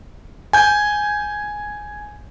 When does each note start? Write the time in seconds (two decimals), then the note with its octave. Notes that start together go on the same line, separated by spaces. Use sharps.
0.53 G#5 G6